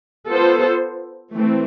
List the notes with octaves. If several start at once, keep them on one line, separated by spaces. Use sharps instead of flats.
B3 F4 A4 C5
E3 A3 C4